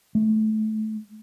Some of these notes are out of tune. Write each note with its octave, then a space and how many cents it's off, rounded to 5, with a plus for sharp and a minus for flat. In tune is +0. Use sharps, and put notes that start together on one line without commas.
A3 -20